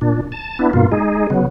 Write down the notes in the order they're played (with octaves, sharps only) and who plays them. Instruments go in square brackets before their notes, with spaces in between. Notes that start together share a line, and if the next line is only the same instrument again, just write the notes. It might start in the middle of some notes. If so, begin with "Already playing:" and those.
[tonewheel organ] A#2 D4
A5
B3 D4 E4
G2 B2 A#3 F4
G#3 D#4 G#4
C#3 F#3 B3